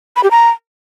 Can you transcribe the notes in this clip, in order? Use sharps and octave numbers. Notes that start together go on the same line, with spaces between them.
B5
G4
A#5